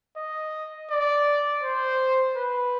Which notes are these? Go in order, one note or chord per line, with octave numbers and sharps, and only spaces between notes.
D#5
D5
C5
B4